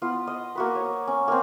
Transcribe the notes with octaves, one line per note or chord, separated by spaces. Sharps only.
B3 F4
D#5
A#3 F#4 B4
C#5
C#4
A#3 C4